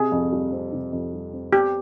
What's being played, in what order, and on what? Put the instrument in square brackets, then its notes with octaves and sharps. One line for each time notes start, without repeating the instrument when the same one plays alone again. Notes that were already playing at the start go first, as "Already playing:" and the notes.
Already playing: [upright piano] C3 [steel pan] G#4
[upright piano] F2
G3
C4
C3
F2
G3
C4
[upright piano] B3 [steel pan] G4